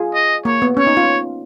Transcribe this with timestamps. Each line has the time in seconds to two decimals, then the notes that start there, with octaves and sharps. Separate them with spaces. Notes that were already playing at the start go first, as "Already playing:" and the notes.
Already playing: F4 G#4
0.14 D#5
0.45 A#3 C#5
0.62 B3
0.77 C#4 C#5
0.87 D#4
0.97 F4